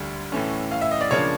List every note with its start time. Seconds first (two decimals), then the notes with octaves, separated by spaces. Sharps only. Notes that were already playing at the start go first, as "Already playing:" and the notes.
Already playing: D2 D3 G3
0.32 A2 E3 A3 C#4
0.72 F5
0.82 E5
0.91 D#5
1.01 D5
1.11 C#3 F3 A#3 D4 C#5